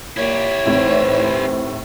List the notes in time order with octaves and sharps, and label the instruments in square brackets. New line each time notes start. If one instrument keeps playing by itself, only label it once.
[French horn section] A#2 [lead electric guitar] E4 G4 [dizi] C#5
[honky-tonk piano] D#2 A2 C4 [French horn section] E3 C5